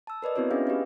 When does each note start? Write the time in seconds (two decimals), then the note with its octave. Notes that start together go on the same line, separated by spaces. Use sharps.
0.07 A5 E6
0.22 A#4 B4 D5 D#5
0.36 B3 C4 E4 F#4 B4 C#5
0.51 C#4 D4 G#4 E5 F5
0.67 F4 G4 B4 D#5 F5